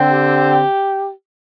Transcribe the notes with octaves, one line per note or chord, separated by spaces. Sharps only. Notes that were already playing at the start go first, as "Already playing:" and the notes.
Already playing: D3 C4
G4